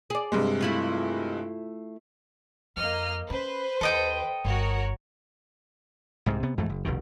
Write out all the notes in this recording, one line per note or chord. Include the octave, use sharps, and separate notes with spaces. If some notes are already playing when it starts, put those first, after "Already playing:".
G#4 D5
G2 C3 G#3
A3 E4 F4
F2 A#3 D#5 F6
C#4 B4 C5
D#2 A4 D#5 G5
G1 F#4 A#4 C#5
C2 G#2 C3
C3 B3
F2 G#2 E3 A3
F#1
F1 C2 B2 D#3